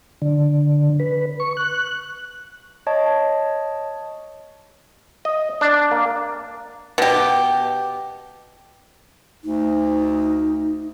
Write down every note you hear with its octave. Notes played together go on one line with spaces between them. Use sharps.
D3
B4
C#6
F#6
C#5 D#5 A5
D#5
D4
A#3
B2 G4
D2 D#4